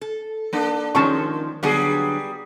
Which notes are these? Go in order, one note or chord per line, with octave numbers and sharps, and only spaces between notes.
A4
A#3 D4
D#3 F3 G#3 C#4 A5 C#6
D3 F#3 G3 B3 G#4